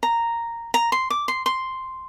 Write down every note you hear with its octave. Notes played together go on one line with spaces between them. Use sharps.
A#5
A#5
C6
D6
C6
C6